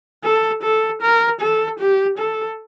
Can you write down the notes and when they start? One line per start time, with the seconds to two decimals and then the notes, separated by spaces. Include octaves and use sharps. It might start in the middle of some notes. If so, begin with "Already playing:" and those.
0.24 A4
0.63 A4
1.02 A#4
1.41 A4
1.79 G4
2.18 A4